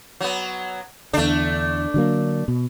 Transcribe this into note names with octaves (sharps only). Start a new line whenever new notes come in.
F#3 B3
E2 D3 A3 D4
D3 F#3 A#3
B2